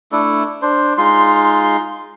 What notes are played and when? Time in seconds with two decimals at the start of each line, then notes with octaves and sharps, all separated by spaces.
0.12 A3 D4 E4 A4
0.62 D4 C5
0.98 G#3 D#4 F4 C6